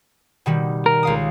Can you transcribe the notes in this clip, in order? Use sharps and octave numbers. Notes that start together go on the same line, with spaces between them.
B2 D#3 G3
A#4
C#2 F5 D#6